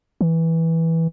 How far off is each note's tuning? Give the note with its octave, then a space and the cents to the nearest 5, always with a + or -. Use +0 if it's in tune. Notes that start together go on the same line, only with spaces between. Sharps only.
E3 -10